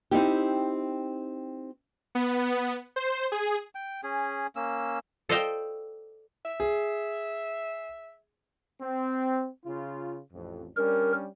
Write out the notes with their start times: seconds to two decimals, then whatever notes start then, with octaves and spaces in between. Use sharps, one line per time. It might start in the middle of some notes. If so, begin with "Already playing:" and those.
0.11 C4 D#4 E4 G4
2.15 B3
2.96 C5
3.32 G#4
3.75 G5
4.03 C#4 G#4
4.56 A#3 C#4 E6
5.29 A4 C5 D5 D#5 F5 G5
6.45 E5
6.60 G#4
8.81 C4
9.64 C#3 F4
10.33 A1 F2
10.77 G3 C#4 D4 A#4